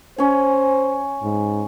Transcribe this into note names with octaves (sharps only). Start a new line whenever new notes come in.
C#4 C5 G#5
G#2